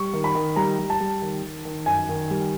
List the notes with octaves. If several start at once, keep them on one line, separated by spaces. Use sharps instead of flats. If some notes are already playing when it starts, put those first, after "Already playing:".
Already playing: G3 C#6
D#3
B5
D#3
G3 A#5
G3
A5
G3
D#3
D#3
D#3
F#2 G#5
D#3
G3